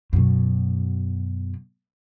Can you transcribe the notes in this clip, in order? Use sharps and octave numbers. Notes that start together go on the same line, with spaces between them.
F#2 B2